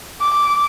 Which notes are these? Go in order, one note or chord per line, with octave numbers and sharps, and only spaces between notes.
D6